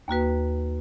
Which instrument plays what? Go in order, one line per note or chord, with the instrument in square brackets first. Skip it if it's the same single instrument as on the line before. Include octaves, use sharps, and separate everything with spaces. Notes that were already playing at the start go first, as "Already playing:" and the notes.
[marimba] D#2 A#3 F#4 B4